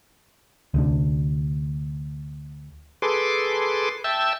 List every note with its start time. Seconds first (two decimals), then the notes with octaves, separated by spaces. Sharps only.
0.74 D2 C3 D4
3.02 G#4 A4 B4 C6 D6
4.04 E5 G5 A5 E6